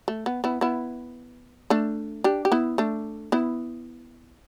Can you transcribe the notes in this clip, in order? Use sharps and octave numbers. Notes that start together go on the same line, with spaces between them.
A3
B3
B3 E4
B3 E4
A3 D4
D4 G4
G4
B3 E4
A3 D4
B3 E4